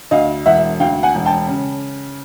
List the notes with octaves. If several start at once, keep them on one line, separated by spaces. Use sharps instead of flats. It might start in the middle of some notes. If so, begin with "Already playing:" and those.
D2 D#5 F5
E1 E5 F#5
D2 F5 G5
F#5 G#5
E1
G5 A5
C#3